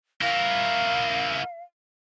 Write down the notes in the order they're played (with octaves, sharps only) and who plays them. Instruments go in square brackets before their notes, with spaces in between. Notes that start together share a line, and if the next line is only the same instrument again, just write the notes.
[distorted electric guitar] E4 A#4 [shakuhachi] F5